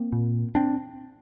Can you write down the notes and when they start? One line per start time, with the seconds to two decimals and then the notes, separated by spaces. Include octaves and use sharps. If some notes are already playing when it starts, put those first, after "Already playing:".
Already playing: A#3 C4
0.12 A#2
0.55 C4 D4